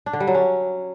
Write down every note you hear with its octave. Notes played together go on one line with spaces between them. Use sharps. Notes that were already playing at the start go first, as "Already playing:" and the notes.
D4
D3
G3
F#3
C#4